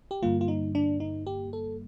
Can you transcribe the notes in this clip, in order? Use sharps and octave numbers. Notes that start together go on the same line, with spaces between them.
G4
G2 D3 G3 A#3 F4
F4
D#4
D4
D#4
G4
A4